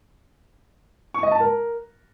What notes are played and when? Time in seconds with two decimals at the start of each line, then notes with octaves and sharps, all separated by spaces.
1.14 C#6
1.23 D#5
1.32 A5
1.40 A#4